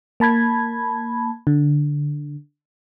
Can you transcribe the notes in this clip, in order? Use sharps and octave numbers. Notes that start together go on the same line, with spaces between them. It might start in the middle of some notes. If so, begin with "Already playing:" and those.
A#3 A5 B5 G#6
D3